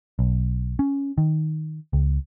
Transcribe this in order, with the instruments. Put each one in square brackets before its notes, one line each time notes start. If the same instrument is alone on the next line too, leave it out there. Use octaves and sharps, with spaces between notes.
[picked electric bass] B1
C#4
D#3
C#2